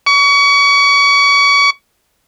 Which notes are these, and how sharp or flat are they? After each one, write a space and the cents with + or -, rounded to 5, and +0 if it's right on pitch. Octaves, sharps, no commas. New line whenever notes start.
C#6 +35